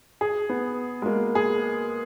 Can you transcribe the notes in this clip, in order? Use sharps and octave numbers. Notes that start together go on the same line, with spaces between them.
G#4
B3
G#3
A#3
G#4